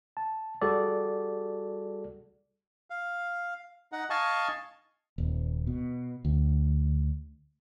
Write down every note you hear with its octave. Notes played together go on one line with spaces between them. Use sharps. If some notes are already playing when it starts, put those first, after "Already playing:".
A5
G3 F#4 G#4 A4 D5
F5
D#4 F#5
D#5 F5 G#5 A5 C#6
D#1
B2
D2